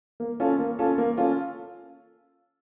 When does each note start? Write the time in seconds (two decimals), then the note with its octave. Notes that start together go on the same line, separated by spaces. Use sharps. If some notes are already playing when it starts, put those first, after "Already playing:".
0.20 A#3
0.40 C#4 F4 A4
0.59 A#3
0.79 C#4 F4 A4
0.98 A#3
1.18 C#4 F4 A4